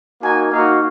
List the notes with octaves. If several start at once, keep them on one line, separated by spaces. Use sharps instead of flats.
A#3 D#4 F#4 G#5
A#3 D#4 F#4 F5